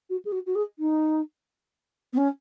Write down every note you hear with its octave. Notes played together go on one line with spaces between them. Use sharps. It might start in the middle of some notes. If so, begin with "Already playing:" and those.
F#4
G#4
F#4
F#4
G#4
D#4
B3
C#4